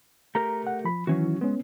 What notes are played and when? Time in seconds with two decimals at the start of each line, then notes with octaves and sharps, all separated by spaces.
0.35 A3 G4 A#4 A#5
0.67 F#5
0.84 F3 B5
1.07 D#3 E3 F#3 C#4 E4 F#4
1.41 G#3 B3 C#4